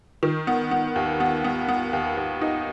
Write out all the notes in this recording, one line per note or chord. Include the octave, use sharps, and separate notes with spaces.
D#3
B3
B3
D#2
B3
B3
B3
D#2
D#2
D#4